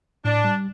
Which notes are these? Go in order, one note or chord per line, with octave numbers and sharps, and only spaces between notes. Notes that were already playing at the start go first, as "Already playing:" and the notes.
A2 D4
G3